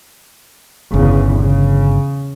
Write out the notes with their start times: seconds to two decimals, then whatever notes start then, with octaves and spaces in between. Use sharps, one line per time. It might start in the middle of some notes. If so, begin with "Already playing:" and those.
0.94 G1 E2 C#3
1.41 C#3